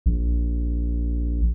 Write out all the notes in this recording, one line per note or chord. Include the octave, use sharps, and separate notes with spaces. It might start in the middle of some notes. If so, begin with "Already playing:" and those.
A#1